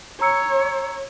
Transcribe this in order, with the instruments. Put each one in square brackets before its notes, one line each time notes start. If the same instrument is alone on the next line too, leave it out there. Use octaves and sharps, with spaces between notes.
[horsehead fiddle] C#5 [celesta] A#5 E6 C#7